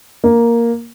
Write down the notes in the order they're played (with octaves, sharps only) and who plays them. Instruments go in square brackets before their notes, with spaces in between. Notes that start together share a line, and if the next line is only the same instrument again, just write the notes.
[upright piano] A#3